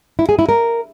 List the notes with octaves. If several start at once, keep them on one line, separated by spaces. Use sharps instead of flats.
E4
G#4
E4
A#4